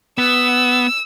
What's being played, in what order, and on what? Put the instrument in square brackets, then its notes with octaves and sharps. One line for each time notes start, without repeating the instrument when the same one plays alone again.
[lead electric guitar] B3 [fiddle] E6